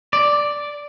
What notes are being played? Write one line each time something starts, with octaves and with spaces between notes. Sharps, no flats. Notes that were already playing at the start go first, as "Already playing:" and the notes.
D5